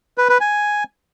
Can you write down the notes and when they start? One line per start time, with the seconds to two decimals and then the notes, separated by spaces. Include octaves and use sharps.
0.18 B4
0.29 B4
0.41 G#5